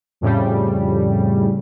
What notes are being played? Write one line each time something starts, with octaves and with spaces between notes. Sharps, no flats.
F2 A2 C#3 G3